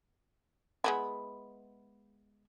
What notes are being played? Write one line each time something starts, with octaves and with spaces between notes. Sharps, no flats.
G#3 B3 E4